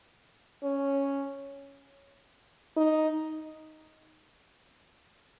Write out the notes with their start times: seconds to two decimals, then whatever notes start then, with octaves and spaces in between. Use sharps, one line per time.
0.63 C#4
2.77 D#4